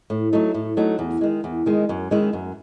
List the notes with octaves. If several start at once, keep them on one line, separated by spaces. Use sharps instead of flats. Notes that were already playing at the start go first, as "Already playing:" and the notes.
A2
F#3 A3 D#4
A2
F#3 A3 D#4
E2
D#3 G#3
E2
D#3 G#3
F#2
D#3 G#3 C#4 E4
F#2